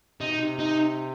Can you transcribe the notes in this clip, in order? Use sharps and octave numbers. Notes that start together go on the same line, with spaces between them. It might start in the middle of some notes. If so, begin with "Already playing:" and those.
C3 D#4
B2
C3
D#4